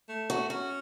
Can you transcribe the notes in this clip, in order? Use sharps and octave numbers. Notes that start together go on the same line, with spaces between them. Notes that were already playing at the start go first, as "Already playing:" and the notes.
A3
F#4
C#4 F#4